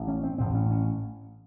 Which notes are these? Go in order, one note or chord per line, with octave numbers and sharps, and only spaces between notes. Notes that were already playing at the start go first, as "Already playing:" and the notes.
Already playing: A1 A2
C#4
C4
A1 A2 C4
C#4
C#4